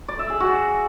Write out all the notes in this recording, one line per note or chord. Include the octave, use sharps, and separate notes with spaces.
D5
E5
G#4
F#4